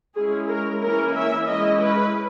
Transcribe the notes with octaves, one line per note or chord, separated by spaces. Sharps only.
G#3 C#4 E4 G#4
A#4
E3 A#3 C#4 E4 A#4
E5
G#3 C#4 E4 D#5
B4